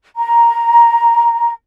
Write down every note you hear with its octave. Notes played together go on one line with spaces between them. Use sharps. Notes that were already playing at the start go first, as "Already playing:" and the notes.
A#5